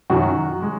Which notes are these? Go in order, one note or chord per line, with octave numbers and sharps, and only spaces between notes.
F#2 D#3 F#3 F#4
G#3